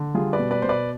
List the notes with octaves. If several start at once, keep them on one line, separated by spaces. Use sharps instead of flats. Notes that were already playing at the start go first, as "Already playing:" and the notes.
Already playing: D3
G3 F4 G#4
B4 D5
B2
B4 D5
B2 C5
B4 D5